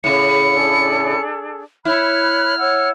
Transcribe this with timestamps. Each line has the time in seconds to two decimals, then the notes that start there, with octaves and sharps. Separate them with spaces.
0.04 A2 C#3 C#7
0.53 D4 G#4 A4
1.85 E4 C#5 B5 F6 F#6
2.58 C#5 F#5 E6